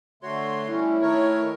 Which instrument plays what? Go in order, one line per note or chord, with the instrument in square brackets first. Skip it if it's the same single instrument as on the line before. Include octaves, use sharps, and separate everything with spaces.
[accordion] D3 A3 C6 [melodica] F#4 C#5
[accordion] A2 G3 C#4 [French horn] E4
[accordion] D#3 A3 C#5 [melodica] A#4